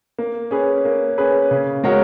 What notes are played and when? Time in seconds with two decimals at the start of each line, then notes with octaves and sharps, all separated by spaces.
0.19 A#3
0.51 C#4 G#4 B4
0.85 A#3
1.18 C#4 G#4 B4
1.51 C#3
1.84 G#3 C#4 F#4 A#4